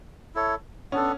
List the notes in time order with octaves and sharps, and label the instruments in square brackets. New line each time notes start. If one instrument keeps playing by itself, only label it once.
[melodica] E4 A4 C#5
[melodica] B3 D4 A4 [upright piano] C#4